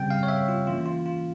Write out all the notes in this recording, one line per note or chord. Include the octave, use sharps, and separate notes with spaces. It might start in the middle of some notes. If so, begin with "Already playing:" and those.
Already playing: C#3 G3 C4 G5
F5
C#5
E5
F4
E3 A#3 C#4 F4
F4
F4